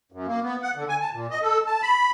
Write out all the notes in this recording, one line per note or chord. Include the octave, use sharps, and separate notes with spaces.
F#2
A#3
B3
F#5
D3
G#5
A5
A#2
D#5
A4
A5
B5